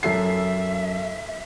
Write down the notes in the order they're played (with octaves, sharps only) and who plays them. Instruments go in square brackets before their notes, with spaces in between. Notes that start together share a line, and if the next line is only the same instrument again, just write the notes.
[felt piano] F#2 A4 C7 [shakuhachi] E5